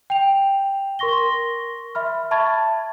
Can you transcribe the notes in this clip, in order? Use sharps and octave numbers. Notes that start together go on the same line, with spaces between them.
G5 F7
A#4 C6 C#6 A#6 G7
E5 B5 F6
E5 A5 B5 C#6 G#6 A6